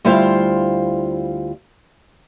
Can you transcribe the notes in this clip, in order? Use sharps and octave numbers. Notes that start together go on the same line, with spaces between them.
D2 G3 E4 F4 C5 F5